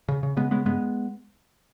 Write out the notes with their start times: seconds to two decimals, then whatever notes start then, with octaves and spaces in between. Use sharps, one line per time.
0.08 C#3
0.23 C#3
0.37 C#3 G#3 B3
0.51 C#3 G#3 B3
0.65 G2 G#3 B3